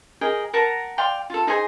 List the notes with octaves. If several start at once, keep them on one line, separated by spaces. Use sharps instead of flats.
G#4 A#4 D#5 G5
A#4 F#5 A5 A#5
D5 F5 G5 C6
F4 A4
D#4 G#4 C5 G#5